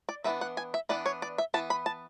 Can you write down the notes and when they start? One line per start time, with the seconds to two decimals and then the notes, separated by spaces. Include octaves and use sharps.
0.09 D5
0.24 E3 B3 D4 E5
0.41 F#5
0.57 G#5
0.74 E5
0.89 E3 B3 D4 D5
1.06 C#5
1.22 D5
1.38 E5
1.54 E3 B3 A5
1.70 B5
1.86 A5